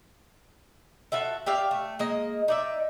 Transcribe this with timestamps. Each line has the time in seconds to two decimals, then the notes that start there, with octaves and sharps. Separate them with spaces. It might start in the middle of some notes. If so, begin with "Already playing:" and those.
1.12 F4 F#4 A4 E5
1.46 G4 D5 E5 F5
1.71 A3
1.99 G#3 A#3 D#5
2.48 D#4 D5 E5